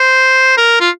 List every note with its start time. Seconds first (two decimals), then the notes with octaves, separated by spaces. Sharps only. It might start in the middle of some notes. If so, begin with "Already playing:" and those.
Already playing: C5
0.57 A#4
0.80 F4